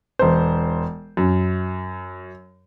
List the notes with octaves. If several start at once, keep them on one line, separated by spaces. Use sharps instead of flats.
E1 C5
F#2